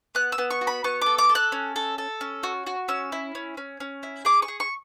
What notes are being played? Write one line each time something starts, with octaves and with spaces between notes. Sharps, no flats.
B3 F#6
E6
B3
C#6
F#4
B5
B3 C#6
A4 D6
D6
A4
F#6
C#4
A4
A4
C#4
F#4
F#4
C#4 E6
E4
C#4
C#4
C#4
E4
G#4 D6
C#6
G#4
C#6